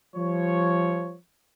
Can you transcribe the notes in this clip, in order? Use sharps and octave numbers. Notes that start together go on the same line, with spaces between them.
F3 G3 C#5